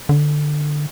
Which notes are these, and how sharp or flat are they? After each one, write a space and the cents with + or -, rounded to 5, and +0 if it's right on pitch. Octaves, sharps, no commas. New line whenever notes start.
D3 +15